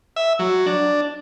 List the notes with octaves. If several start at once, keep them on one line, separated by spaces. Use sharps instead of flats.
E5
F#3
D4